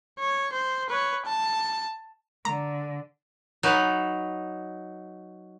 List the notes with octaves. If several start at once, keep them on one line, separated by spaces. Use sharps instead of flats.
C#5
C5
B4 C#5
A5
D3 A#5
F#3 D#4 B4